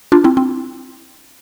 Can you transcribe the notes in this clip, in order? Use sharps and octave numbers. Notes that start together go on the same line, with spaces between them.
D4 F4
C4 E4
C4